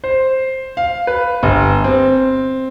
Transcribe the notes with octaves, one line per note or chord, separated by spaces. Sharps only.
C5
F5
B4
G1
C4